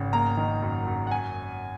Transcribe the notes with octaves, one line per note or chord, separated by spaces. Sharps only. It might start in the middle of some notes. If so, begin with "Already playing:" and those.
Already playing: G#1 C#3
A#3 A#5
D#3
F#2
F#2
F#5
G#5